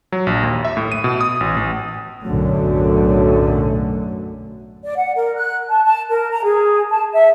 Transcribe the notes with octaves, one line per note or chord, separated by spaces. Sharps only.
F#3
A#1
D#2
E5
A2
D#7
B2
D#6
A1
A1
B1 F#2 A2 D3 F#3 A3
D5
F#5
A#4
F#6
A5
A5
A#4
A#5
G#4
A5
E5